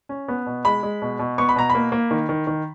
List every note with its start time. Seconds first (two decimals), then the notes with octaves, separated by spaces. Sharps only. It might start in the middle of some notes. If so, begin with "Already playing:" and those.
0.09 C#4
0.28 B3
0.46 B2
0.65 G#3 B5
0.83 G#3
1.02 B2
1.19 B2
1.38 B3 C#6
1.49 B5
1.56 B2 A#5
1.70 B5
1.75 A#3
1.92 A#3
2.11 D#3
2.29 D#3
2.47 D#3